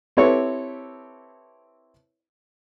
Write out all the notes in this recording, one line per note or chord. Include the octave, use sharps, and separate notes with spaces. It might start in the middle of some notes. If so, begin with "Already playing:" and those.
C4 E4 G4 A4 B4 C#5